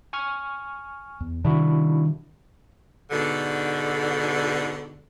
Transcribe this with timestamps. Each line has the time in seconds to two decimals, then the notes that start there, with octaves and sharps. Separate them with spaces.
0.13 G#5 C#6 F6
1.20 E2
1.45 C3 D#3 G3 D4 E4 F#4
3.11 G#2 B2 D3